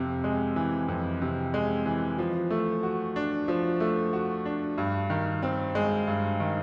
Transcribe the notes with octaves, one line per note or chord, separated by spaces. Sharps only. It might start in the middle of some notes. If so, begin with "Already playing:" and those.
Already playing: F2 C3
G#3
E3
F2
C3
G#3
E3
F3
A3
F#4
D4
F3
A3
F#4
D4
G2
D#3
C4
G#3
G2
D#3